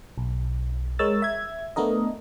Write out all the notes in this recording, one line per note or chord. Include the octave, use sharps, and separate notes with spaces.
B1
G#3 A#4 C#5 E6 A6
E5 G#6
A3 B3 D4 A#4 D#5